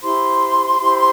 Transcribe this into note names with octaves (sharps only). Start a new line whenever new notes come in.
E4 G4 C5 C6
E4 G4 C5